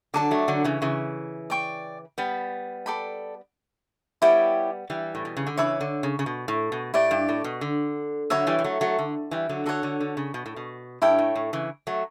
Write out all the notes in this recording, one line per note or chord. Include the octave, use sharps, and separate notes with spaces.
D3 F#3 D5 A5 D6
F#3 A3
D3 F#3
C#3 E3
C#3 E3
D5 G5 C#6
G3 B3
A4 D5 G5 B5
G3 B3 E4 G4 C#5 G5
E3 G3
A2
B2
C#3
D3
C#3 E3 C#5 E5 B5 D6
D3
C#3
C#3
B2
A2
B2
A2 E4 G4 D5
G2
A2
B2
D3
D3 F#3 C#5 E5 B5
E3 G3
G3
F#3 A3
F#3 A3
D3
E3 G3
D3 F#3
D3 F#4 A4 C#5 F#5
D3
D3
C#3
B2
A2
B2
G2 E4 A4 C#5 G5
A2
A2
C#3 E3
F#3 A3